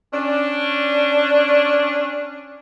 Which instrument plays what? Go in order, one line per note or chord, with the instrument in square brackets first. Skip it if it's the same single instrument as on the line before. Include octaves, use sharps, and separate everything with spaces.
[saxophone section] C#4 D4